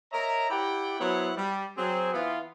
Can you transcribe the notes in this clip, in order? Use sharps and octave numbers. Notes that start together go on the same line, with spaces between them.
A#4 C#5 D#5 E5 A#5
E4 G4 D5 F#5 G5
F#3 B3 E4 C5 C#5 F#5
G3
F#3 C4 G#4
E3 B3 F4